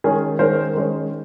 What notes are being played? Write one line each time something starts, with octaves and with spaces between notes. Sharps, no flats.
D#3 G#3 C#4 G#4 A#4
D#3 G#3 C#4 A#4 C5
D#3 G#3 C#4